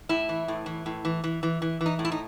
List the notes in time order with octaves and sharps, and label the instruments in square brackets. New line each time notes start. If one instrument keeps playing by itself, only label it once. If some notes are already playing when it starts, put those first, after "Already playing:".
[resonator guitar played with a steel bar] A2 E4
E3
A2
E3
A2
E3
E3
E3
E3
E3
D#4
A2
E4
D#4